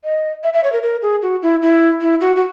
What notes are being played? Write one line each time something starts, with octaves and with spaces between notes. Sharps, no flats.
D#5
E5
E5
C#5
A#4
A#4
G#4
F#4
E4
E4
E4
F#4
F#4